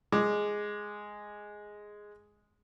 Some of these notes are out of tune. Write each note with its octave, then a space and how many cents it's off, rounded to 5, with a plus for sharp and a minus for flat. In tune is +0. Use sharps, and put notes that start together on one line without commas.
G#3 +0 D6 +10